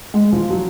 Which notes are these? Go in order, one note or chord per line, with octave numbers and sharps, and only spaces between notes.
G#3
F3
F#3